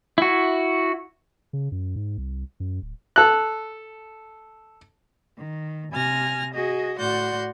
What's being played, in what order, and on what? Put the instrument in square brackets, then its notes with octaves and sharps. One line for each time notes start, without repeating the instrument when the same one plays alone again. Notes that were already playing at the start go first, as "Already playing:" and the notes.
[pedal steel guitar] E4 F#4
[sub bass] C#3
F#2
G#2
C2
F#2
D1
[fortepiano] A4 F#6
[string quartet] D#3
C3 G#5 F6 A#6
F#4 G#4 D#5
A2 F#4 D5 F#5 C6 G6